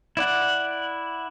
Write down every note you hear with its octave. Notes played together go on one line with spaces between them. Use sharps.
E4 D5 F#5